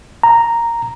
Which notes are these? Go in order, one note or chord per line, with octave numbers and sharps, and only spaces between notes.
A#5